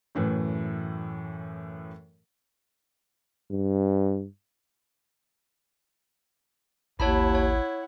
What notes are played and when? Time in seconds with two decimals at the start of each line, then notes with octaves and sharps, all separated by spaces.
0.15 F#2 A2 E3
3.51 G2
7.00 A1 D#2 E4 C#5 F#5 A5 B5
7.35 C#5